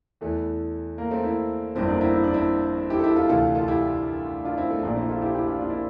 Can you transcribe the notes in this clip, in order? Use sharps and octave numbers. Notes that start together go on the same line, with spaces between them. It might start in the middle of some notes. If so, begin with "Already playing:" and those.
E2 E3 A3
A#3
A3 C4
C4 E4
G1 F2 D3 F3 C4 E4
A#3 D4
C4 E4
E4
D4
C4 E4
E4 G4
A4
E4 G4
F4 A4
D2 C3 E3 F4 A4
F4 A4
E4 G4
D4 F4
C4 E4
A3 C4
A#1 A#2 F3 A#3 D4
C4 E4
F4 A4
E4 G4
E4 G4
D4 F4
D4 F4
C4 E4